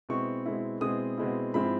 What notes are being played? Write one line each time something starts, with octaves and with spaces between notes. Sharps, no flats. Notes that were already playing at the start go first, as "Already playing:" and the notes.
B2 G#3 C4 E4 C#6
B2 G#3 C4 E4
B2 G#3 C4 E4 D#6
B2 G#3 C4 E4
G#2 F3 G#3 C4 E4 B5